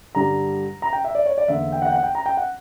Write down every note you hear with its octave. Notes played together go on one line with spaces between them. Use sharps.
G2 D3 G3 A#5
A#5
G5
E5
D5
C#5
D5
E2 D3 A#3 E5
G5
F#5
G5
F#5
G5
A#5
G5
F#5